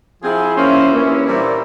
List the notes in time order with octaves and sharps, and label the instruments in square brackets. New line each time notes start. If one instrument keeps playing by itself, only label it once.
[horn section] F3 C4 E4 G#4
F3 A#3 C#4 E4 C5
G2 E3 A#3 C#4 E4
A#2 G3 C4 E4